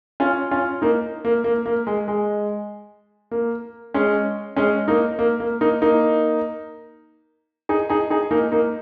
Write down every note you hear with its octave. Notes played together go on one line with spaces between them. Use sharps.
C#4 F4
C#4 F4
A#3 D#4
A#3
A#3
A#3
G#3
G#3
A#3
G#3 C#4
G#3 C#4
A#3 D#4
A#3
A#3
A#3 D#4
A#3 D#4
D#4 G#4
D#4 G#4
D#4 G#4
A#3 D#4
A#3 D#4